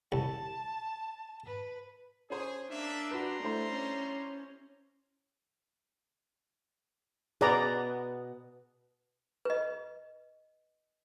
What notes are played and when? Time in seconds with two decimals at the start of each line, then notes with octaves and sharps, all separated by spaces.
0.12 C2 A5
1.46 B4
2.30 C#4 G#4 C5 C#5
2.71 A#3 D4 E5
3.11 G3 F#4 B4 A#5 C6
3.43 A3 D4 E4 C5
3.72 C#4
7.41 B2 B3 G#4 D5 A#5
9.45 B4 D#5